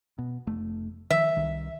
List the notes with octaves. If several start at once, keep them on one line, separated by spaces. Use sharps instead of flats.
B2
F1 A3
D#3 F3 E5
C2 D#3